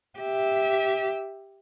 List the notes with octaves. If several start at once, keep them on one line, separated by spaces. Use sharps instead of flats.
G4 E5